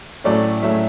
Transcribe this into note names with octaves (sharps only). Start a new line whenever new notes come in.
A2 F#3 A3 C#4 D5
A2 F#3 A3 C#4 E5